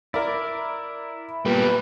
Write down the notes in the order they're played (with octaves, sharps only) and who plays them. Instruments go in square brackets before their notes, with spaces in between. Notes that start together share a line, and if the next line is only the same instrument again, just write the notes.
[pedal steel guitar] E4 [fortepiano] A#4 D5
[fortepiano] A#2 [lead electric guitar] G3 B3 [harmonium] B4